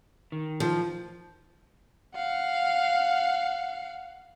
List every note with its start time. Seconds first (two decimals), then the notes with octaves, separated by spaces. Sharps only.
0.32 D#3
0.60 F3
2.15 F5 F#5